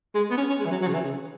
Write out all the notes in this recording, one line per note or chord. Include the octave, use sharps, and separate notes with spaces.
G#3
B3
C#4
C#4
G#3
E3
F#3
F#3
C#3
E3
C#3